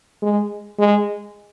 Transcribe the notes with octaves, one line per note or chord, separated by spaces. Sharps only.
G#3
G#3